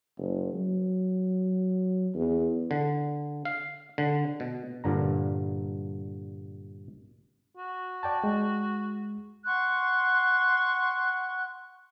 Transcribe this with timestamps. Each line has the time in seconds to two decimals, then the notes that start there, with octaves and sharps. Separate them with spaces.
0.17 F#1
0.54 F#3
2.14 E2
2.71 D3
3.45 F5
3.98 D3
4.40 B2
4.84 G2 A#2 D3 A#5
7.57 F#4
8.03 D5 G5 A5
8.24 G#3
9.46 F#5 C6 C#6 F#6